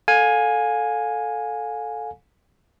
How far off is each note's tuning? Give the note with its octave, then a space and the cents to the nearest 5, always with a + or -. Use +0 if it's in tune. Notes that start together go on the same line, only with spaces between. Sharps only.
A4 +0 F5 +30 G#5 +0